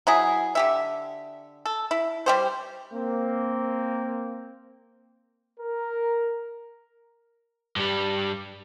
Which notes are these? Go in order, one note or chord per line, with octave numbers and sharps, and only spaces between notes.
F#3 E4 G#4
D3 G4 E5
A4
E4
G3 G4 C5
A#3 C4
A#4
G2 G3